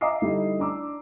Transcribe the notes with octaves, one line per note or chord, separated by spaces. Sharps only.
E5 F5 A#5 D6 D#6 C7
D3 G3 A3 D#4 E4 G4
D4 A#5 D6 E6